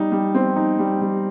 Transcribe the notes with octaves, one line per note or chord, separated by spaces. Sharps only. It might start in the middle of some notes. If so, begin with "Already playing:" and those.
Already playing: G3 D#4
G3
C4
D#4
G3
G3